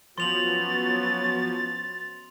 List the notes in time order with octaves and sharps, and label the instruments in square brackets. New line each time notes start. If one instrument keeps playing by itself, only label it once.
[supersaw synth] F3 [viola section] F#3 B3 C#4 [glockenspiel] C6 F7 F#7 [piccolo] A6